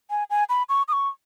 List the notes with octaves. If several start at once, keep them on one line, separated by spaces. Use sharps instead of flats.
G#5
G#5
B5
C#6
D#6
C#6